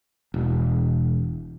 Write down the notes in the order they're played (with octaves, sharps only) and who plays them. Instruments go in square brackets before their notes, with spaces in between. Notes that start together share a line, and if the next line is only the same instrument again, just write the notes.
[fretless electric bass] E1